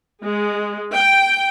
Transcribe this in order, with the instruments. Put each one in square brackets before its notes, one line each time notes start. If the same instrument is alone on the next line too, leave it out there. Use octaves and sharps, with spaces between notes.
[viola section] G#3
G5